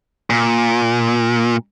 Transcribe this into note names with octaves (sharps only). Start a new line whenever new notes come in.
A#2